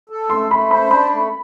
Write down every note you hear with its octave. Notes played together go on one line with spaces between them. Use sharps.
A4
A3 C6
A3 B5
C5 B5
D4 B5
A3